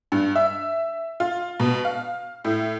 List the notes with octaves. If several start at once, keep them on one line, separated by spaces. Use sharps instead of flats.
G2
E5
F4
B2
F5
A2